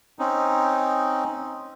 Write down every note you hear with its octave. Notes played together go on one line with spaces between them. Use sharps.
C4 C#4 D#4